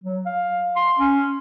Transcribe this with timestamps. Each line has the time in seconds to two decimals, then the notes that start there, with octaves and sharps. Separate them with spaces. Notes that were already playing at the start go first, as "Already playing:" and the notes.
0.04 F#3
0.26 F5
0.76 C6
0.99 C#4